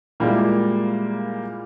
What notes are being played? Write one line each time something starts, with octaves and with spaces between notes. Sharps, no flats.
A#2 G3 G#3 A#3 E4